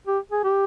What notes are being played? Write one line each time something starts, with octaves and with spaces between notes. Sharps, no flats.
G4
G#4
G4